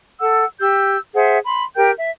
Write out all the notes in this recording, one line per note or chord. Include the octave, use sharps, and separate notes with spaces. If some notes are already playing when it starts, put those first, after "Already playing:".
A4 F#5 E6
G4 E6 G6
G#4 C5 E5 F#5
B5 C6
G4 A#4 G5 G6
E5